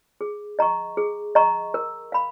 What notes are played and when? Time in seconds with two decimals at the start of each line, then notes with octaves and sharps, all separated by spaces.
0.21 G#4
0.59 D#5 A#5 C#6
0.97 G#4
1.35 D#5 A#5 C#6
1.74 A#4
2.12 F5 B5